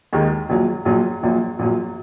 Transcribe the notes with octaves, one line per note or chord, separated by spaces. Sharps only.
D#2 D#3 G#3 D#4
A#1 A#2 F#3
A#1 A#2 F#3
A#1 A#2 F#3
A#1 A#2 F#3